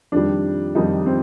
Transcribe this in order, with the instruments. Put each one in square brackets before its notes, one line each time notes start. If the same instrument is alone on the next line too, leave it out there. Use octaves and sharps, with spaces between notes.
[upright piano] F2 D#3 G3 D4
F2 D#3 G3 D#4
C4